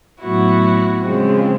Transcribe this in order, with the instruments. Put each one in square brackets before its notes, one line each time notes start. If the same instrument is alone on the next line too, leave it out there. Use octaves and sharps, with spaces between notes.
[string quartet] A2 F#3 B3 E4 F#4
C#3 F3 G#3 C4